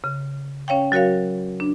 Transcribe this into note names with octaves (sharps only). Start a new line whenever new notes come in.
C#3
C#4 C#5 F5 G5
F#3 F#4 A#4 C#5 F5
D4